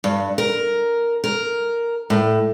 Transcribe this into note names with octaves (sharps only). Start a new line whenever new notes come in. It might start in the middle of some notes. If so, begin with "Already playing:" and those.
G2
A#4
A#4
A2